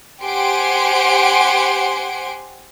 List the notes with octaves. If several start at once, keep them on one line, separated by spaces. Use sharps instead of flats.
G4 C5 F#5 G#5 C6 D7